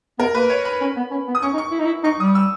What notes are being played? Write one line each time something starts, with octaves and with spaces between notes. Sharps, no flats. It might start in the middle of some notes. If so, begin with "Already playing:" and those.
B3 A#4
A#3 B4
C#5
B5
C#4
B3
C#4
B3
D#6
C#4 C#6
D#4
C#6
E4
D#4
E4
D#4 C#6
G3 D#6
E6